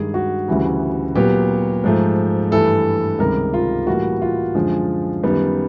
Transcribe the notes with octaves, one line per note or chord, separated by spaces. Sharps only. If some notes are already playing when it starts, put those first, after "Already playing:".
Already playing: G2 D#3 G#3 G#4
F#4
D2 C#3 E3 G3
A#2 F#3 B3 G4
G#2 F3 A3
G2 E3 A3 A4
C#2 C3 D#3 G3 A#4
F4
A2 E3 G3 A#3 F#4
F4
F#2 D3 F3 G#3
F#2 D#3 G3 B3